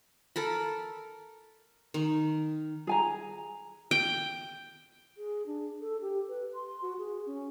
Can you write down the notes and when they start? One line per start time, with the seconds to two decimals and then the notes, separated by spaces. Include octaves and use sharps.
0.36 A4 A#4 B5
1.94 D#3
2.87 G#4 G#5 A#5
3.91 G5
5.17 G#4
5.46 D4
5.81 A4
6.01 G4
6.29 B4
6.54 C6
6.82 F#4
6.99 G#4
7.26 C#4